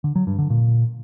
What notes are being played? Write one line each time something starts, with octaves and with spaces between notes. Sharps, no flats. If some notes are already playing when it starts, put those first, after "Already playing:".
D3
F#3
G2
D3
A#2